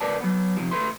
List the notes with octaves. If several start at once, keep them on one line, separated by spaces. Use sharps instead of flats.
C#2 A#4 B4 D5 A5
F#3 B3
C3 F3
D2 A3 B4 C6